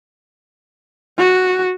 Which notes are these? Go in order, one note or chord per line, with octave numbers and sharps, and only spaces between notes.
F#4